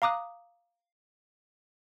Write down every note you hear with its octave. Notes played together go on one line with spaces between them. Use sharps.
F5 A#5 D6 D#6 F#6